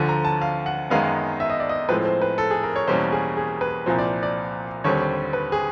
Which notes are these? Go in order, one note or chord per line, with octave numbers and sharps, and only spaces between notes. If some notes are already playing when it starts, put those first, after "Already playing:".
Already playing: D2 D3 F3
A#5
A5
F5
F#5
F#2 D#3 G#3 B3 F5
E5
D#5
D5
D#5
A2 F3 G#3 C4 B4
C5
B4
A4
G#4
A#4
C#5
E2 B2 G3 A#3 C#4 C5
G#4
G#4
B4
C2 A#2 F3 C5
D5
D5
D#2 D3 G3 C4 C#5
B4
G#4